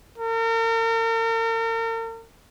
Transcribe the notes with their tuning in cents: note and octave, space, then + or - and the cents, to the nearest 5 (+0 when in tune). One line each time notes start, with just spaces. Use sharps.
A#4 -40